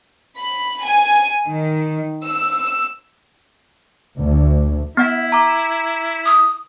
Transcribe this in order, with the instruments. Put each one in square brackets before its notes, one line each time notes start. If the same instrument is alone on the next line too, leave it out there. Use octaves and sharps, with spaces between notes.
[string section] B5
G#5
D#3
E6
[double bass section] D2
[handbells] B3 F#5 [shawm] E4
[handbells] A#5 D6
[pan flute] D#6